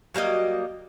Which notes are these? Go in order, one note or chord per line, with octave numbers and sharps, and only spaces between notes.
F#3 G3 A#3 D#5